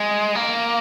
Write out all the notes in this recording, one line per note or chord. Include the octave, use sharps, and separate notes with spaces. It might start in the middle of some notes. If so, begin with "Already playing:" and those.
Already playing: G#3
A#3